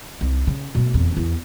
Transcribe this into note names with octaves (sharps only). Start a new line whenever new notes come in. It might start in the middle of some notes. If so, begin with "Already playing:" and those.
C2
C#3
B2 A3
F1 E2
E2 B3